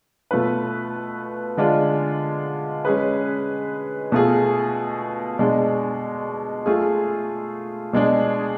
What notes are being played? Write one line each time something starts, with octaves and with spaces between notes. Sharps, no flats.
B2 A3 F4 B4
D3 G#3 D4 F4
G#3 C#4 G#4 B4
B2 A3 F4 G#4
B2 G#3 D4
A3 F4 G#4
B2 G#3 D4 G#4